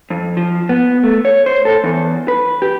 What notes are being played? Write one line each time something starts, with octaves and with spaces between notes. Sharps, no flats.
F2
F3
B3
A3
C#5
C5
A4
E2
B4
G4